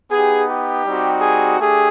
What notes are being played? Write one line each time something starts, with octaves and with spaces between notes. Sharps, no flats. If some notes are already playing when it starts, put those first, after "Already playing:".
B3 D#4 G4 G#4
G4
G3 C4 D#4 F#4
G#4
A3 D4 G4 G#4